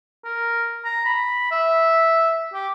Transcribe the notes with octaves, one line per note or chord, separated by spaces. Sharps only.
A#4
A#5
B5
E5
G4